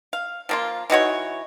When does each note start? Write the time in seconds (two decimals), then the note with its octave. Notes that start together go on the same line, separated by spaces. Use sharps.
0.13 F5
0.49 F3 A#3 F4
0.90 E3 D#4 F#4 C#5